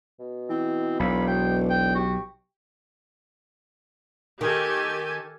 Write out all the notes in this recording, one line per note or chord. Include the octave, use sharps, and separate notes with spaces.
B2
E3 C4
E1 B1 F4 B5
B2 G5
G5
F#4 G4
D#3 G4 A4 G#5